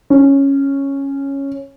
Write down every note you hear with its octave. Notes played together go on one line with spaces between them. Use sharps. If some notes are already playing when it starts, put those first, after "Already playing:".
C#4